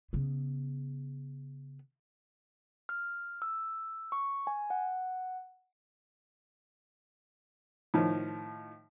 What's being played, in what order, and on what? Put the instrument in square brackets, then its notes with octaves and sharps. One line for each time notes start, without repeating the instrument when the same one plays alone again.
[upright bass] C#3 B3
[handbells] F6
E6
C#6
G#5
F#5
[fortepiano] A2 D#3 F3